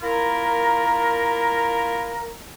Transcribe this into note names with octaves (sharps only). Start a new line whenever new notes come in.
A#3 E4 F4 A#4